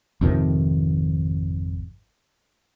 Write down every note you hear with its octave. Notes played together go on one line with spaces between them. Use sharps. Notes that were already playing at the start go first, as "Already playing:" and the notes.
G#1 F2 C3 D#3